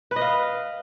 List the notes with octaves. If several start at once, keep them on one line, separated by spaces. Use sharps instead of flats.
B4
D#5
F5